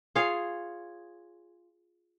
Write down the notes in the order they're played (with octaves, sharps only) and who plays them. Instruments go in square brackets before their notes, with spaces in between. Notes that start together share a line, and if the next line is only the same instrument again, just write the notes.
[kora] F4 G#4 C#5 F5